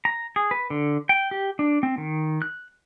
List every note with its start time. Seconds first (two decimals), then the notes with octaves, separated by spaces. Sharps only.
0.05 A#5
0.36 G#4
0.51 B4
0.70 D3
1.09 G5
1.31 G4
1.59 D4
1.83 C4
1.98 D#3
2.42 F#6